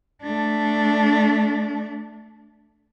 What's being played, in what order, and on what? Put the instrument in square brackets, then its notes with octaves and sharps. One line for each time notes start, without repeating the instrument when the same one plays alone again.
[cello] A3 D4